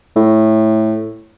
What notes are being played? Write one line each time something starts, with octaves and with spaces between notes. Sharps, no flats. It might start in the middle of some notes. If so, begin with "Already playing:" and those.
A2